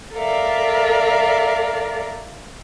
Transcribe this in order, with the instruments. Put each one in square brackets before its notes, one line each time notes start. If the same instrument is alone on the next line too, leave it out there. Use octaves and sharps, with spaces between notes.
[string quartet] A4 A#4 D5 E5 F5